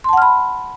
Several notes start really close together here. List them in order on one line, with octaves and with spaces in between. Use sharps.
C6 A5 F#5 F6 B5